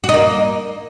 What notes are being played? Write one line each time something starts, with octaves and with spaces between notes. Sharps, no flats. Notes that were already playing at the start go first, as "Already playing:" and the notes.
F#4
D#4
A#3